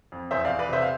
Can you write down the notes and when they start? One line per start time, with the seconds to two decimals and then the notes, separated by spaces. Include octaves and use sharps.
0.12 F2
0.31 E2 C5 E5
0.45 E2 D5 F5
0.59 B4 D5
0.69 C3 C5 E5
0.82 F5